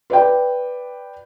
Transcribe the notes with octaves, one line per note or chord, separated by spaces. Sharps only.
B4 D5 G5